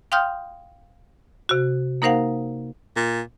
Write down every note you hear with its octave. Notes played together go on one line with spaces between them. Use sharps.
F5 G5 C6 D#6 F6 G6
C3 F#4
A#3 D#4 A#4 C5 F5 F#5
A#2